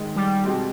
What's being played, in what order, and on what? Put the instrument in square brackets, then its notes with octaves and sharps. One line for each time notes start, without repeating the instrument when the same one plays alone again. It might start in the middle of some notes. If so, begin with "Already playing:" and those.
Already playing: [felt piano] G#2 D#3 G#3
[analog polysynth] G3
[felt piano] B2 G#3 C4 G4